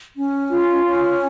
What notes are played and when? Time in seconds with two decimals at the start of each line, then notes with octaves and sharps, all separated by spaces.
0.16 C#4
0.51 F4
0.84 C#4